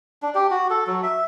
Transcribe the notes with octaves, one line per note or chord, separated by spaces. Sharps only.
D4
G4
F#4
A4
F#3
E5